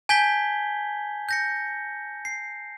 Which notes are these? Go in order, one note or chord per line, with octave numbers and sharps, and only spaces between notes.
G#5 A5 G6 G#6 B6 G7
G6 A#6 C#7
C7